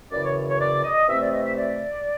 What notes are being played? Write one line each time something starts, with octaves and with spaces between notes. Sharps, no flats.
F#2 C#3 E3 D5
C#5
C#5
D5
D#5
C3 E3 A3 C4 E5
D5
D#5
E5
D5